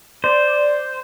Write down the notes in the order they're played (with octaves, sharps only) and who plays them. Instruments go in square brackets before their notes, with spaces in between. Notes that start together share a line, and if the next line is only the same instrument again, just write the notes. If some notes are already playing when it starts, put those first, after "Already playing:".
[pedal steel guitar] C5 [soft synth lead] D5